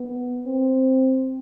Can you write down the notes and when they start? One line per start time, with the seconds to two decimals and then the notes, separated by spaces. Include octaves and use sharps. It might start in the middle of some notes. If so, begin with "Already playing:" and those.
Already playing: B3
0.46 C4